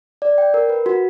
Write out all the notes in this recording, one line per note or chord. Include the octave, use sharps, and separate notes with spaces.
D5
G5
A#4
B4
F#4